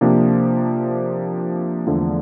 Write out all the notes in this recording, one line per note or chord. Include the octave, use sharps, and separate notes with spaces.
C3 F3 A#3 D4
E2 D3 F3 A3